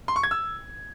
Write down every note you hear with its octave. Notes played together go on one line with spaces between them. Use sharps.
C6
C#6
G#6
E6